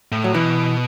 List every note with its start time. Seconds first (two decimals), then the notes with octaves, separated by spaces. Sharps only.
0.12 A2
0.24 F#3
0.34 B2 E3